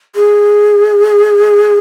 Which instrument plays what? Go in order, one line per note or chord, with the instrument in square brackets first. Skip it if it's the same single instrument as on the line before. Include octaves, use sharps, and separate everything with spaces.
[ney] G#4